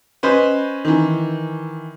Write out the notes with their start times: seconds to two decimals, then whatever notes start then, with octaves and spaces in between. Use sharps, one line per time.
0.23 C#4 B4 C5 D#5
0.85 D#3 E3